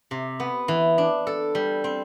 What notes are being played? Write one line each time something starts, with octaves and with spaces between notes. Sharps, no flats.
C3
B3
E3
D4
A4
G3
C4